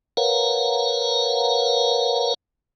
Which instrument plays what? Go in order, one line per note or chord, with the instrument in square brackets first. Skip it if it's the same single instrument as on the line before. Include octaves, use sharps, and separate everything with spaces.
[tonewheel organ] A#4 B4 C#5 F5 F#5 A#5